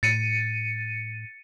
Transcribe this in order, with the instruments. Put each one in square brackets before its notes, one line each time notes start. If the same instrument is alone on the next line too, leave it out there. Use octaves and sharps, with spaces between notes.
[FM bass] A2 [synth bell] A6 C#7 D#7